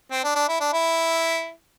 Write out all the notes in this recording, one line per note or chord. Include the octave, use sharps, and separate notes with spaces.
C4
D4
D4
E4
D4
E4